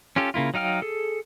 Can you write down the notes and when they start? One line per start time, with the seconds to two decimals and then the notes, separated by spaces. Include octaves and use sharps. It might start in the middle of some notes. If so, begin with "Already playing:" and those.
0.16 C#4 F4 G4 A4
0.34 C#3 A#3 E4 F4
0.54 F#3 D#4 F5 G5 F6
0.82 G#4 A4